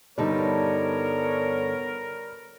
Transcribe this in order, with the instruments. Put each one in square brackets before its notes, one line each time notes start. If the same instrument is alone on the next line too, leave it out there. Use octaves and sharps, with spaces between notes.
[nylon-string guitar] G2 D3 D#4 [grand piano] G3 [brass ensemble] B3 C#5 [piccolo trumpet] A#4